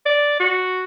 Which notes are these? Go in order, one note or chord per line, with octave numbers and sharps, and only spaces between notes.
D5
F#4